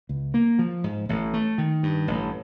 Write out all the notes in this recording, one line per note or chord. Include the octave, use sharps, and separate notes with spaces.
C#2
A#3
F3
G#2
A1
A3
D#3
G2
A1